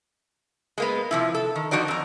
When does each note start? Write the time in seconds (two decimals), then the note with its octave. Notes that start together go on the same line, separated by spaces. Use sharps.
0.78 G#3 A#3 B3
1.11 C3 F3 E4
1.35 A4
1.56 D#3
1.71 F3 D#4 F#4 D5 D#5
1.88 F2 A#5